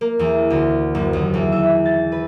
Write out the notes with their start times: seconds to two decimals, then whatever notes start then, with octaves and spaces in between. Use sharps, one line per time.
0.01 A#3
0.19 E2
0.50 D2
0.95 F#1
1.13 D#2
1.34 E2
1.52 E5
1.85 A6
2.12 B4